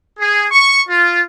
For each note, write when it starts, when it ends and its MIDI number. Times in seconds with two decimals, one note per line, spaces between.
0.19 0.46 68
0.51 0.81 85
0.89 1.21 65